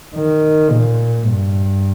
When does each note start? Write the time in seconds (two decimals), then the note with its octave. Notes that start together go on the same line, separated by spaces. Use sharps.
0.16 D#3
0.71 A#2
1.27 G2